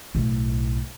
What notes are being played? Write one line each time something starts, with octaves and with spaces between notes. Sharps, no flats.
B1 A2